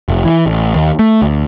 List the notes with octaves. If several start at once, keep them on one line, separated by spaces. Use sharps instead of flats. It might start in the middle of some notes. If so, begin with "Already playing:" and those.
F1
E3
A1
D#2
A3
D2